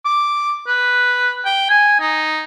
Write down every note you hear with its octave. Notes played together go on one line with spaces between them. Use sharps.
D6
B4
G5
G#5
D#4